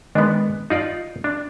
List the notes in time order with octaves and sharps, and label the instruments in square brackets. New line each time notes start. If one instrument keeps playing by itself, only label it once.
[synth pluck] D#3 G#3 [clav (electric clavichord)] B3 D4
[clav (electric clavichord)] D#4 F4 D5
D4